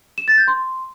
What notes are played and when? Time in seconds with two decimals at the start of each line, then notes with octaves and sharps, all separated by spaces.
0.18 E7
0.28 A6
0.38 G6
0.48 C6